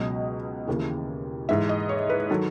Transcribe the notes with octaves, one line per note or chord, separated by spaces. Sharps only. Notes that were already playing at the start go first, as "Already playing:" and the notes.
Already playing: C#2 B2 F#3 D#5
D#2 C#3 E3
G#2 E3 E5
D#5
C#5
B4
D#3 F#3 A4